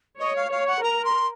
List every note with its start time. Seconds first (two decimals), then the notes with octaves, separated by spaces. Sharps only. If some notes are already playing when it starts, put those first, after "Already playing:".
0.20 C#5 D#5
0.36 F5
0.52 C#5 F5
0.67 F#5
0.83 A#4 A#5
1.05 C6